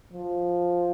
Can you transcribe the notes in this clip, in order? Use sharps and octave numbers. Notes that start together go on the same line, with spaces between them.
F3